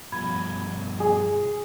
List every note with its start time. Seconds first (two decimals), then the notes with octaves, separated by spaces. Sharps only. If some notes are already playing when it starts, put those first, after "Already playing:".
0.12 G2 B2 F3 B5 G#6
1.00 G#4